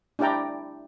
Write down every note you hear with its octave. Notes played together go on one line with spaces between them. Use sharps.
D4 E4 G4 D5 G5 A#5